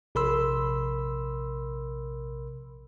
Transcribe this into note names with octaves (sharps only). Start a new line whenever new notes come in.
A#1 C3 A#4 B5 C6 E6